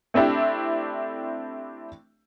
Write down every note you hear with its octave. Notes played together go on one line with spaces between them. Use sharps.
A3 C4 D4 E4 G4